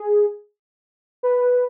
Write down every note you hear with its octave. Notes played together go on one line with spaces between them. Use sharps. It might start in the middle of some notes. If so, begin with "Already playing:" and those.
Already playing: G#4
B4